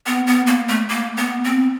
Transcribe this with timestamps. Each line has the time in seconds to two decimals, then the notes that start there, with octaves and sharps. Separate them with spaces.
0.07 B3
0.27 B3
0.47 A#3
0.68 A3
0.89 A#3
1.17 B3
1.44 C4